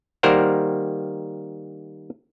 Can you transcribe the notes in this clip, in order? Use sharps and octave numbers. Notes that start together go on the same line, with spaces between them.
D#3 G3 A#3 A#4 C5 F#5